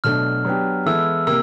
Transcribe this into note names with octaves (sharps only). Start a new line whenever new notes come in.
B2 F#3 A3 D4 F6
F#3 B3 D4 G4
E3 G#3 B3 E4 A4 E6
C3 A#3 E6